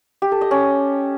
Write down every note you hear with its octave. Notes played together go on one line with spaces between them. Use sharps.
G4
A4
D#5
C#4